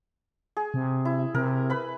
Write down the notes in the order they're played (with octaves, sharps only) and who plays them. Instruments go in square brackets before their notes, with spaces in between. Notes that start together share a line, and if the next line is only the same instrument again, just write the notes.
[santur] G#4
[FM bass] C3
[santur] E4
[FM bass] C3 [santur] A#4
[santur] B4 B5